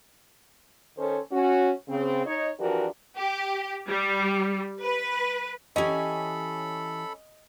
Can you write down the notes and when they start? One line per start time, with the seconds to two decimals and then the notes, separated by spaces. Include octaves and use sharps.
0.98 D#3 C#4 A4 C5
1.32 C#4 F#4
1.89 C#3 C4
2.26 D#4 C#5
2.60 E3 F3 D4 F#4 G4 A#4
3.17 G4
3.89 G3
4.82 B4
5.76 E3 C#4 G4 A4 D#5 G#5 B5